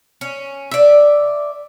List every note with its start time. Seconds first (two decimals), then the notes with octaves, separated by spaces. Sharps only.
0.21 C#4
0.71 D5 E5